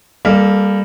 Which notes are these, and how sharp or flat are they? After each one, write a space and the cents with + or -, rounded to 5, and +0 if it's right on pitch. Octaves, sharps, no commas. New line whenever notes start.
G3 +15 A#3 +0 A4 -25